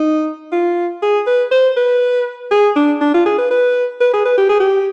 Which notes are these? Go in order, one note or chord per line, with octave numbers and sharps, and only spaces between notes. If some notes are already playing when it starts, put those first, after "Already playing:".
Already playing: D#4
F4
G#4
B4
C5
B4
G#4
D4
D4
F4
G#4
B4
B4
B4
G#4
B4
G4
G#4
G4